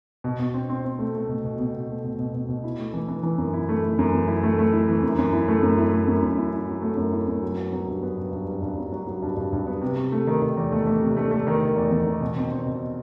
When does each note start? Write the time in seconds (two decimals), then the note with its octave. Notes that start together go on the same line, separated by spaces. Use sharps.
0.24 B2
0.39 B2
0.54 C4
0.69 C4
0.84 C4
0.99 A3
1.15 A3
1.29 B2
1.44 B2
1.59 B2
1.73 B2
1.89 A3
2.04 B2
2.19 B2
2.34 B2
2.49 B2
2.64 E4
2.79 A3
2.94 E3
3.08 E3
3.23 E3
3.38 F#2
3.54 E4
3.69 A3
3.84 E4
3.99 F#2
4.13 E3
4.28 E4
4.43 A3
4.58 A3
4.73 E4
4.88 E3
5.03 F#2
5.18 F#2
5.33 E4
5.48 A3
5.63 F#2
5.78 E4
5.92 A3
6.08 F#2
6.22 F#2
6.38 E4
6.53 E4
6.68 F#3
6.82 A3
6.97 F#2
7.13 E4
7.28 F#2
7.43 F#3
7.58 B3
7.73 F#3
7.87 G2
8.03 B3
8.18 G2
8.32 G2
8.47 G2
8.62 G2
8.78 F#3
8.92 F#3
9.07 F#3
9.22 G2
9.37 G2
9.53 G2
9.67 B3
9.81 C3
9.97 C3
10.12 A3
10.27 D#3
10.42 D#3
10.57 E2
10.72 A3
10.86 A3
11.02 C3
11.17 A3
11.31 A3
11.47 D#3
11.61 D#3
11.76 E2
11.91 E2
12.06 D#3
12.21 B2
12.36 C4
12.51 C4
12.66 B2